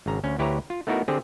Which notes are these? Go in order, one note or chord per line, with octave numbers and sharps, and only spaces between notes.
G#1 C#3 A#5
D2 C#4
D2 E4 G4 B4 C#5 A#5
F4
A3 B3 D#4 E4 F#4 A#4
D3 C4 G4 G#4